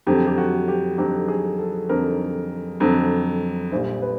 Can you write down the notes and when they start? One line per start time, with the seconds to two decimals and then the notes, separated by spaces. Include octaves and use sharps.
0.07 F2 D3 F#3 G4
0.27 G4
0.38 F#4
0.68 G4
0.98 F2 D3 F#3 G4
1.28 G#4
1.58 A4
1.89 F2 D3 F#3 A#4
2.80 F2 D3 F#3
3.72 A#1 A#2 G3 C5
4.02 B4